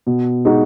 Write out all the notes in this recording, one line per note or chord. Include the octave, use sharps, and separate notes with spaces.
B2
G#3 D#4 F#4